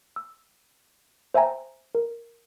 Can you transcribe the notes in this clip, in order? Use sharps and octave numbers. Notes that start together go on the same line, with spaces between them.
E6
C5 E5 G5 G#5 A#5
A#4